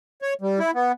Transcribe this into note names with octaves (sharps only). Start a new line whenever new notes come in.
C#5
G3
E4
B3